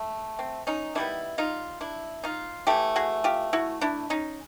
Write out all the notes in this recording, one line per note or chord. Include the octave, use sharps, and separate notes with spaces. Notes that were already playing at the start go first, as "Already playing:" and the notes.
Already playing: A3
C4
C#4 D#4
D#3 G3 B3 D4 E4
D#4 F4
D4 E4
D#4 F4
E3 A3 G4 A4
F#4 G#4
F4 G4
E4 F#4
D4 E4
C#4 D#4